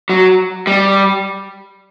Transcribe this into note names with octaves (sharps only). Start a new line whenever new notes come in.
F#3
G3